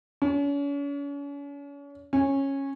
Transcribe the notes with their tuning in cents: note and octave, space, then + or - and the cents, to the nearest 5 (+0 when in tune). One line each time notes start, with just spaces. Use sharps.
C#4 +40
C#4 -15